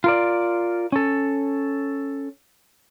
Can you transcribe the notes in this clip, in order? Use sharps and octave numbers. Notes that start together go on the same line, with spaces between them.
F4 A#4 D5
C#4 A4